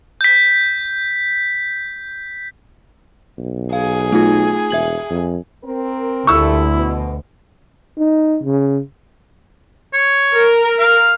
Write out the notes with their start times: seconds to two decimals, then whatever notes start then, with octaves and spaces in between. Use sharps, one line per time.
0.21 G6 B6
3.38 B1
3.73 G#4 F5 G#5
4.12 A3 D#4 F4
4.70 E1 E5 G#6 F#7
5.10 F2
5.63 C4 A#4
6.27 D2 A#2 G3 A3 E4 C#6 E6
6.74 B2
7.98 D#4
8.43 C#3
9.94 C#5
10.34 A#4
10.79 F5